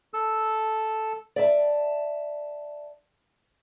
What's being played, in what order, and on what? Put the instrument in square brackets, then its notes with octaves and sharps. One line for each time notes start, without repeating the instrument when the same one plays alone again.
[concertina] A4 E6
[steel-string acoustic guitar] D5 E5 A5